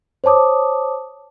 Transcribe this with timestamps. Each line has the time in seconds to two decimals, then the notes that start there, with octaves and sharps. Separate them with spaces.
0.24 C5 C#5 A5 D6 D#6